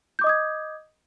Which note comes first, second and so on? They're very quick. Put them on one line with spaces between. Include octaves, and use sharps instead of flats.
G6 D6 D#5 D#6 G#6